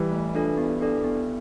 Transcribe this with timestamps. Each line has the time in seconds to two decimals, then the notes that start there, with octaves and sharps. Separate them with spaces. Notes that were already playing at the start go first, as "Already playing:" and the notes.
Already playing: E3 G3
0.12 A3
0.35 D4 F4 A4 D5
0.57 B3
0.81 D4 A4 D5
1.04 B3